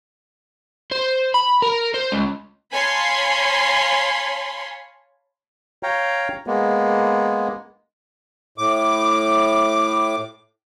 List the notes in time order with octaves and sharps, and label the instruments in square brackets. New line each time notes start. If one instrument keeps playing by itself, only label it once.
[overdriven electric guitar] C5
B5
A#4
C5
C#2
[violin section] C#5 F5 G#5 A5 B5 C6
[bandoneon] C#5 F5 G5 A#5
G#3 A#3 B3
[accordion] A2 D6